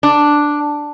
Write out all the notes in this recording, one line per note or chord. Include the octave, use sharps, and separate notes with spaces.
D4